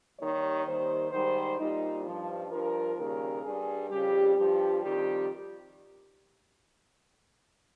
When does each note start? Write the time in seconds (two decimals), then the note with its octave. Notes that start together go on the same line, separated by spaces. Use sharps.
0.19 D#2 D#3 G3 C#5
0.66 D#2 D#3 G3 C5
1.11 G#2 D#3 G3 C5
1.58 A#2 G3 D#4
2.04 G2 F3
2.50 G2 F3 A#4
2.97 D#2 C#3 G3 A#4
3.43 G2 G3 G#4
3.89 F2 C#3 G3 G4
4.36 G2 F3 G4
4.82 F2 D#3 G3 G4